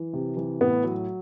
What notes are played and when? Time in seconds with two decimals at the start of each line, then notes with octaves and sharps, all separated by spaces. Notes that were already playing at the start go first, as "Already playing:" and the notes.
Already playing: E3
0.13 C3
0.37 E3
0.61 A2 B3
0.84 F#3